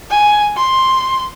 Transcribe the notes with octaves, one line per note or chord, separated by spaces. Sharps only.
G#5
C6